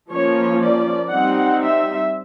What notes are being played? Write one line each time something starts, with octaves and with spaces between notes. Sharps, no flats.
F3 A#3 C#4 C#5
D5
G3 C4 D#4 F#5
E5